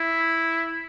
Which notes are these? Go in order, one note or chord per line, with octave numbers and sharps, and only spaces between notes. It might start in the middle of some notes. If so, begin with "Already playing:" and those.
Already playing: E4